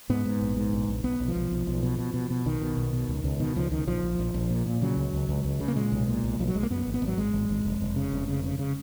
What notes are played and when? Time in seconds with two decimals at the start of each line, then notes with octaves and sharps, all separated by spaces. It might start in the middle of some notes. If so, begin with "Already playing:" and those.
0.10 G#2 B3
0.25 G#2
0.41 A#1
0.57 G#2
0.73 A#1
0.88 A#1
1.04 B1 B3
1.20 B1
1.28 F3
1.35 B1
1.51 B1
1.67 B1
1.83 B2
1.99 B2
2.14 B2
2.30 B2
2.46 B1 D#3
2.61 B2
2.77 B1
2.93 B2
3.08 C#2
3.24 C#2
3.40 B2 D#3
3.56 C#2 F3
3.71 C#2 D#3
3.87 A#1 F3
4.03 A#1
4.19 A#1
4.34 A#1
4.50 A#2
4.66 A#2
4.82 C#3 F#3
4.97 C#2
5.13 C#2
5.29 C#2
5.45 C#2
5.60 C#3
5.68 A#3
5.76 A#2 G#3
5.92 B1
6.08 A#2
6.23 B1
6.39 B1 F3
6.48 F#3
6.55 B1 G#3
6.63 A#3
6.70 F#2 B3
6.87 G#1
6.94 B3
7.02 G#1
7.07 F#3
7.18 G#1 G#3
7.33 G#1
7.49 G#1
7.65 F1
7.81 F1
7.96 C#3
8.12 F1
8.28 C#3
8.44 C#3
8.59 C#3